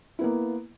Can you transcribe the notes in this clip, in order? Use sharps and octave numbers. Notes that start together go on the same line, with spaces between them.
A#3 B3 E4